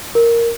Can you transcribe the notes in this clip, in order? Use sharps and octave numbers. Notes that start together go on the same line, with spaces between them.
A#4